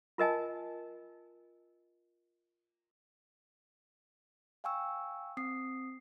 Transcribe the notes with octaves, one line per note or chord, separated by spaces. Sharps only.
F4 A#4 D#5 G#5 A5
F5 G5 G#5 C#6 E6
C4 D#6 C7